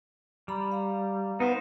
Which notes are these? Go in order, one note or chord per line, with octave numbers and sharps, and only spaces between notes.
G3 A#5 B5
F5 A#5
B3 D#4 A#4 C5